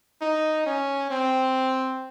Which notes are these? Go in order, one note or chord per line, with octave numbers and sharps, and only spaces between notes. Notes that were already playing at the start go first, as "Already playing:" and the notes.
D#4
C#4
C4